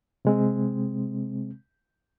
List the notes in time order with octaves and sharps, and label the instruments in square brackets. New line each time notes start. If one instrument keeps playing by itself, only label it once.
[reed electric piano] C3 G#3 C4